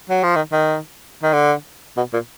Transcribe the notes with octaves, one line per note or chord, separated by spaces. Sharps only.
F#3
F3
D#3
D#3
D#3
D3
B2
A#2